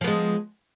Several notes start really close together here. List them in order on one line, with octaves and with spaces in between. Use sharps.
F3 B3 G#3